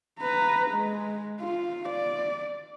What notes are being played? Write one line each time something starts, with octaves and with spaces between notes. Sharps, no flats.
B4 A#5
G#3
F4
D5